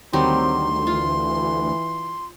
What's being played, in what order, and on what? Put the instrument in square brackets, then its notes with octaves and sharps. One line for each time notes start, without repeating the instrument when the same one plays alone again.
[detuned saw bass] D2 [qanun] D#3 F#3 G3 [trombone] C4 [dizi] C6
[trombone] E3 [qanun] F4